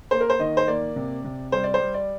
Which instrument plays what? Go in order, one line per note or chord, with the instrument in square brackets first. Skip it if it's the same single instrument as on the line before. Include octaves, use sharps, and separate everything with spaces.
[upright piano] A#3 C5
A#4
C5
D#3 D#5
C5
A#3 D5
C3
C3
G3 C5
D5
C5
G3
D5